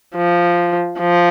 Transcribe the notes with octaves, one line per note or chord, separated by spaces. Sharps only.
F3
F3